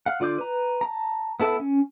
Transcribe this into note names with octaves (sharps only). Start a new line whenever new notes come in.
F5 F#5
D3 F4 D5 D6 G6
B4 A#5
A5 A#5
B3 E4 A4 E5
C#4